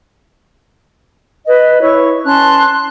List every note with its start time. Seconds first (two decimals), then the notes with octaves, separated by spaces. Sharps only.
1.47 B4 D#5
1.81 E4 C#5 C#6
2.26 C#4 A5 C6 F#6